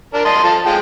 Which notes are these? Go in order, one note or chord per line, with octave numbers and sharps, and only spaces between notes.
D4 A#4
D#5 A5 C6
F3 A4
F3 G#3 G5